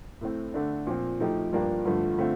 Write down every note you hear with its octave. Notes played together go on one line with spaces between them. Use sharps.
A2 A3 C4
D3 A3 D4
A#2 F3 C4
A2 F3 A3 D#4 G4
G2 F3 A#3 D4 G4
G2 D3 F3 A3
D3 A3 C4 F4